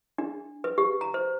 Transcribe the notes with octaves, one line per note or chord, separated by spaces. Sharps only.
D4
B4
G4
A#5
C5